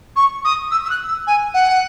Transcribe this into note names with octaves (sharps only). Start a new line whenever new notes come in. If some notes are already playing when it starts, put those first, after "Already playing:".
C#6
D#6
E6
E6
F#6
E6
G#5
F#5